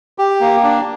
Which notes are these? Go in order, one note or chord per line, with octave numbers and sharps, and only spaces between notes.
G4
A#3
D4